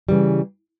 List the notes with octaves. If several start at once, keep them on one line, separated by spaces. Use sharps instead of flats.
C#3 E3 G3